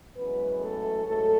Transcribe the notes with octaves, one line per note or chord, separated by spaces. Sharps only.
F#2 E3 G#3 B3 B4
A3 A4
G#2 F#3 A3 A4